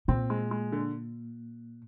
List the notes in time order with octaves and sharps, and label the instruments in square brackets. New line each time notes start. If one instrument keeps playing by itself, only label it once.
[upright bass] A#2 [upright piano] C4
[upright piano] G#3
G#3
D3